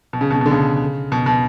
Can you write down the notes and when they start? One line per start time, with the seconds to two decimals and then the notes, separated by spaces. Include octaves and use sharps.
0.13 B2
0.21 C#3
0.30 B2
0.35 C#3
0.41 B2
0.46 D3
0.51 C#3
1.12 B2
1.26 B2